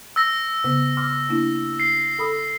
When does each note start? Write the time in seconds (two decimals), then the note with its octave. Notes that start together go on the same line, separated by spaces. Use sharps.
0.16 E6 A#6
0.64 C#3 B3
0.97 C6 D6 F6
1.29 A#3 D4 E4
1.79 C7
2.19 A4 B5 D#6